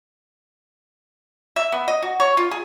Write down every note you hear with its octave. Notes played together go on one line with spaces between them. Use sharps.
E5
B3
D#5
F#4
C#5
F4
G#4